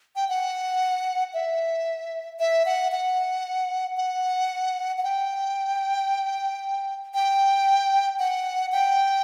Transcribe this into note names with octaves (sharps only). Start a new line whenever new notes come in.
G5
F#5
E5
E5
F#5
F#5
F#5
F#5
G5
G5
F#5
G5